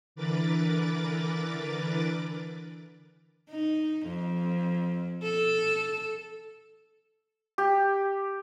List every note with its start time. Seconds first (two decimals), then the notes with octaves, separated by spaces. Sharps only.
0.16 D3 E3 A#4 B4 D6 A6
3.51 D#4
4.06 F2
5.23 A4
7.58 G4